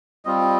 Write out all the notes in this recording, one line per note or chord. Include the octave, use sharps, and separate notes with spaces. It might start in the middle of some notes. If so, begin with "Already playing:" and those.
G3 C4 F4 D#5